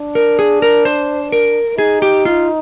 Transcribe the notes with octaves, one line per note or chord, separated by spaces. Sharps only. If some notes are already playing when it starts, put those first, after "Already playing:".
Already playing: D4
A#4
G#4
A#4
C5
A#4
D#4 G#4
G4
F4